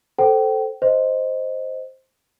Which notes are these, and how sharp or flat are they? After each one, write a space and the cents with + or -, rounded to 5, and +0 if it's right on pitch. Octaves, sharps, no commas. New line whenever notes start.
A4 +0 C5 +0 G5 -25
C5 +0 D#5 +0